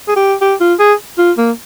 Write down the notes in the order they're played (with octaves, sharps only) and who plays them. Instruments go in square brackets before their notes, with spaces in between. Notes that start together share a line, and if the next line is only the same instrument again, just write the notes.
[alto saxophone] G#4
G4
G4
F4
G#4
F4
A#3